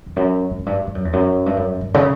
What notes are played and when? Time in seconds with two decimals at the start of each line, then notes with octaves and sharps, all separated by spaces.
0.06 E2
0.16 F#2
0.51 G2
0.59 F#2
0.66 G2
0.87 G2
0.95 F#2
1.05 E2
1.13 F#2
1.46 G2
1.57 F#2
1.81 G2
1.94 C#3